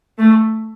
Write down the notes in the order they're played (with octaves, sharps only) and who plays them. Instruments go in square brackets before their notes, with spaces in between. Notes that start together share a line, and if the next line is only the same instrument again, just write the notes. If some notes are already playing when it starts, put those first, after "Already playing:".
[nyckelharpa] A3